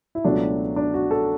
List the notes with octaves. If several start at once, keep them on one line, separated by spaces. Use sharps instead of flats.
E4
C#2 B2 F#3 A3 D4
D4
F#4
A4